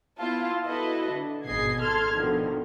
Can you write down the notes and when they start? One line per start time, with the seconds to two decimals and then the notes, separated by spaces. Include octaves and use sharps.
0.19 B3 E4 F4 A5
0.66 E4 F#4 A4 B4 D#5 E5
1.12 D3
1.46 G#1 B2 G#4 D#5 G#6 C7
1.80 A4 A5 C6 F6 G#6
2.16 B2 D3 D#3 F3